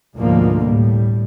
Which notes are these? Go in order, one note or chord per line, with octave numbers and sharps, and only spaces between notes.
D2 G#2 B2 D3 F3 A#3
A2 G3